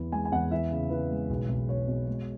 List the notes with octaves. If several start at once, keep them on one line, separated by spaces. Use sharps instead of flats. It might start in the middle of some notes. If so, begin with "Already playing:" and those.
Already playing: E2 E3
G#3 G#5
G#5
E2 F#5
E3 E5
C#3
E3 B4
G#3
B1
B1
B1 C#5
B2
G#3